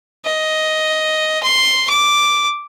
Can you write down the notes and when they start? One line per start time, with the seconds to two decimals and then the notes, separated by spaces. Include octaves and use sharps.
0.25 D#5
1.43 C6
1.90 D6